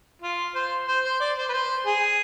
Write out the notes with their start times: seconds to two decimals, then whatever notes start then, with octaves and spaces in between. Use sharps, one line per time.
0.21 F4
0.55 C5
0.87 C5
1.04 C5
1.20 D5
1.37 C5
1.49 B4
1.53 C5
1.86 G#4